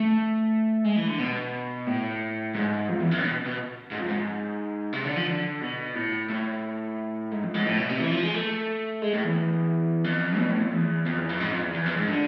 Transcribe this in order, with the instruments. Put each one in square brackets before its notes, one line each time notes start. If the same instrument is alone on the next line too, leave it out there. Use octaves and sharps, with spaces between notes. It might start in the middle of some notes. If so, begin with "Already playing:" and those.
Already playing: [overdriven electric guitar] A3
G#3
E3
D3
B2
A2
G#2
F2
E2
F2
B2
B2
G#2
F2
G#2
C3
D3
F3
D3
B2
A2
A2
G#2
F2
G#2
A2
B2
C3
E3
F3
G#3
A3
G#3
A2
E2
F2
B2
A2
F2
E2
F2
E2
F2
G#2
F2
E2
E2
F2
G#2
D3